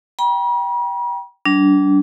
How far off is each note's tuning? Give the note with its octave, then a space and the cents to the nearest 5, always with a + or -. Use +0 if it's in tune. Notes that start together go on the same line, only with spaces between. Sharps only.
G5 +0 B5 -45
G3 -40 D4 -25